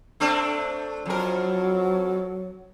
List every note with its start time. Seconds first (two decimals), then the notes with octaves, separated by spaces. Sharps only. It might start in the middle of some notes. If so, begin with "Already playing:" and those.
0.20 A3 C4 D4
1.06 F2 F#3 A#4